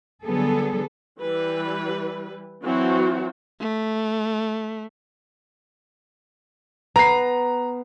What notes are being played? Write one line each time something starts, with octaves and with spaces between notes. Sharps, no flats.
D3 F#3 G3 B3 G#4 A4
E3 G3 B4
E3 F#3 C4 F#4
A3
B3 A#5 C7